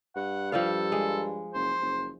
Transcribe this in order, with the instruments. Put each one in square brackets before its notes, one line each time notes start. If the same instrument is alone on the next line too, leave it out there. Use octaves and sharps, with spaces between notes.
[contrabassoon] G2 [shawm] F#5
[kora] F3 G3 F5 [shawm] A4
[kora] G#3
[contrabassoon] F#1 [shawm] C5
[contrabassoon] F#1